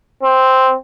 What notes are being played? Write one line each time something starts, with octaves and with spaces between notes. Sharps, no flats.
C4